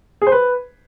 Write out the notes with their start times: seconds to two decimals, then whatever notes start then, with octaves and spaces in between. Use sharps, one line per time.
0.22 G#4
0.27 C5
0.32 B4